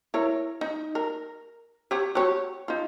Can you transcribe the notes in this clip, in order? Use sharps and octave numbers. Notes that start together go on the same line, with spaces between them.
E4 A#4 C#5
D#4
A#4
G4 C#5 F#5
F#4 G4 C#5
D#4 F4